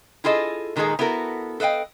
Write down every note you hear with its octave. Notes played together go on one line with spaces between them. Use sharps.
E4 F4 G#4 A4 D#5
A#2 D#3 G#3 D#4 G#4 A4
B3 E4 F#4 A4 A#4
A4 B4 D#5 F5 G5